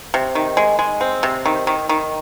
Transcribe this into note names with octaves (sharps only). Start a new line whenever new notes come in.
C3
D#3
G#3
G#3
C4
C3
D#3
D#3
D#3